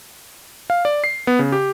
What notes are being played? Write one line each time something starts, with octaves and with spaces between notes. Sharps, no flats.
F5
D5
C7
B3
C#3
G4